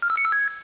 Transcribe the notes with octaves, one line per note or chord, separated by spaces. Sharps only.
F6
E6
C#7
E6
G#6